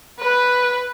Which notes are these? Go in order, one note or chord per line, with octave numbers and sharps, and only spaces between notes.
B4